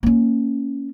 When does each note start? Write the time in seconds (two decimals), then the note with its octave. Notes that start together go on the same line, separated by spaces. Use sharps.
0.03 A#3 C#4